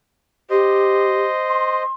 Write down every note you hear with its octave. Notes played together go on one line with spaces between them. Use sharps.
G4 C5 D#5
C6